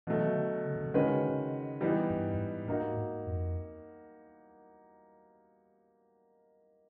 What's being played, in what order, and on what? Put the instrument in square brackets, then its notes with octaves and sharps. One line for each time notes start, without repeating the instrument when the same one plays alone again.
[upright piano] B2 F#3 A3 [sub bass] E3
[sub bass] D#3
D3
C#3
D3
C#3
[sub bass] D3 [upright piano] D#3 G#3 C#4 F#4 B4
[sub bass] C#3
D3
C#3
[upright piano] E3 G3 B3 D#4
[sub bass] G2
G2
G#2
[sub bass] G#2 [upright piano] A#3 D#4 F#4
[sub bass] G#2
F2